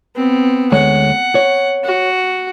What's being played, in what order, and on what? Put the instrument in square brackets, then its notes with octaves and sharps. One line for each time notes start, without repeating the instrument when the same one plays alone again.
[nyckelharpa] B3 C4
[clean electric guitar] D2 G#3 C#5 [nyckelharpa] F#5
[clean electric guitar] C#5
[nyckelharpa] F#4